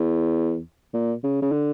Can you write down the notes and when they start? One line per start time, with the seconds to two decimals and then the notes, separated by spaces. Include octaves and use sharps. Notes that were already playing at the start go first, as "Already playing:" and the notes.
Already playing: E2
0.94 A#2
1.23 C#3
1.42 C#3
1.52 D3